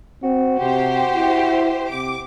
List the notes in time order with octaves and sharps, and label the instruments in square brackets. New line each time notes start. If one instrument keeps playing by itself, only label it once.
[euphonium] C4 [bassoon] F#4
[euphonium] C3 [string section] G4 C5
[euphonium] E4
[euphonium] C3 [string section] D6